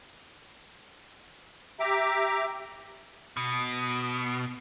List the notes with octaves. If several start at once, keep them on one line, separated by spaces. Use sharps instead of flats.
G4 E5 A#5 D6
B2